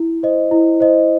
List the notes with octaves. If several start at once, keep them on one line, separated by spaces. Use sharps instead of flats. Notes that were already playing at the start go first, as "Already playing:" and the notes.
Already playing: E4
C5 D#5
E4
C5 D#5